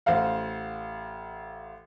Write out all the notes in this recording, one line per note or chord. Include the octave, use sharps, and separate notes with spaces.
A1 C5 F5 F#5